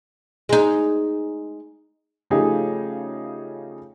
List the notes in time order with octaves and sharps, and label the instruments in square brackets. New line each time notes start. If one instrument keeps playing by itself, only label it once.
[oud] G#3 D#4
[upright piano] C#3 F3 A3 D#4 G4 G#4